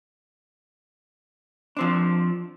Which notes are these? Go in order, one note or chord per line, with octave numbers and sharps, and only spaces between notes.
F3 C4 D4